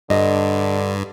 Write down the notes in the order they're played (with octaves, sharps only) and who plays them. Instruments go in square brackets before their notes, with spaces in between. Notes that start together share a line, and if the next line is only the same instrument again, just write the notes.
[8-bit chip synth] G2 [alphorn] D3 [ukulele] D#5